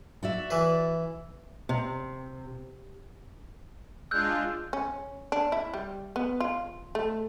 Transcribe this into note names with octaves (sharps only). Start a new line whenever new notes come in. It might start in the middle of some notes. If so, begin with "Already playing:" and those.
F#4 D5 E5
E3 B4
C3
G#3 D4 F4 E6 F#6 G6
C#4
D4
E4
G3
B3
F4
A3